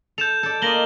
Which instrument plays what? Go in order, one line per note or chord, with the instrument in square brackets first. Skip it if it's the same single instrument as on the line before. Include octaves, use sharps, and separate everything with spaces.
[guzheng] A4 [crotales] G6 E7 F7
[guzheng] A4 D5
[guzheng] A#3 F4 D#5 [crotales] A#6 F#7 G7